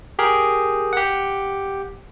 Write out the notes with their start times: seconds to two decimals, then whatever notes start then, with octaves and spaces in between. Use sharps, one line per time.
0.19 G4 G#4 A#4
0.93 G4 F#5